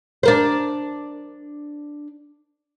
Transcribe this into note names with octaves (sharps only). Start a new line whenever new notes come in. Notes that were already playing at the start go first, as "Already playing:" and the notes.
D4 A#4 C5